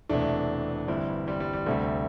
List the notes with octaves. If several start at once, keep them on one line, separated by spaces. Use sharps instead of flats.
E1 E2 C3 A3 D4
G1 G2 E3 G3 C4 E4
G3 C4
G3
G3
D2 C3 G3 A3